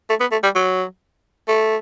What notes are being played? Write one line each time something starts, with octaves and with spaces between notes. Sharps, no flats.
A3
B3
A3
G3
F#3
A3